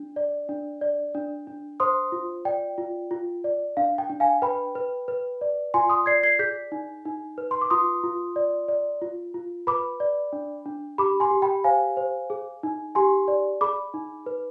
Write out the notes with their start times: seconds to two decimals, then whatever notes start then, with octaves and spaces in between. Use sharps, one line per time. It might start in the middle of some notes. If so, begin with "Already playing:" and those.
Already playing: D4
0.16 D5
0.49 D4
0.81 D5
1.15 D4
1.47 D4
1.80 C5 C6 D#6
2.12 F4
2.45 D5 G5
2.78 F4
3.11 F4
3.44 D5
3.77 D4 F5
3.98 G5
4.10 D4
4.20 F5 G#5
4.42 B4 G5 B5
4.75 B4
5.08 B4
5.41 D5
5.74 F4 G#5 C6
5.90 C6 D#6
6.06 D5 G#6 C7
6.23 G#6 C7
6.39 G#4 G6 B6
6.72 D#4
7.05 D#4
7.38 B4
7.51 C6
7.62 D6
7.70 F4 C6 D#6
8.04 F4
8.36 D5
8.68 D5
9.02 F4
9.34 F4
9.67 B4 B5 D6
10.00 D5
10.33 D4
10.66 D4
10.98 G4 B5 D6
11.20 G#5 C6
11.31 G4
11.42 G5 B5
11.64 C5 F5 G#5
11.97 C5
12.30 G#4
12.63 D#4
12.95 G4 G#5 C6
13.28 D5
13.61 G#4 B5 D6
13.94 D#4
14.26 B4